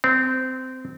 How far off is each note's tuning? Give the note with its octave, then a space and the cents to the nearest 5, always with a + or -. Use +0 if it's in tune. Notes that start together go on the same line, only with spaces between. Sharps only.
C4 -20